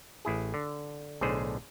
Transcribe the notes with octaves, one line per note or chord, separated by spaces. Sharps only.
A1 E4 G#4
D3
B1 A2 D3 G#4 C5